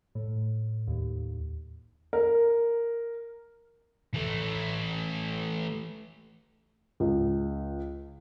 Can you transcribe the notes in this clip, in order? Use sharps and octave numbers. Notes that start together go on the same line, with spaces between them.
A2
D#2
A#4
E3 A3
C#2